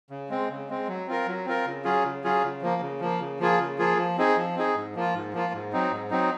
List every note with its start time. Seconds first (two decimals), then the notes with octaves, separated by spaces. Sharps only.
0.10 C#3
0.29 G#3 C4
0.49 C#3
0.69 G#3 C4
0.88 F#3
1.07 C4 F4 A#4
1.27 F#3
1.46 C4 F4 A#4
1.66 C#3
1.84 F#3 C#4 F4 G#4
2.04 C#3
2.24 F#3 C#4 F4 G#4
2.43 C#3
2.62 F3 A#3
2.82 C#3
3.00 F3 A#3
3.20 C#3
3.40 F3 A#3 F4 G#4
3.59 C#3
3.78 F3 A#3 F4 G#4
3.97 F3
4.18 C4 D#4 G#4
4.36 F3
4.55 C4 D#4 G#4
4.75 G#2
4.95 F3 A#3 F4
5.14 G#2
5.33 F3 A#3 F4
5.53 G#2
5.73 F#3 C4 D#4
5.91 G#2
6.10 F#3 C4 D#4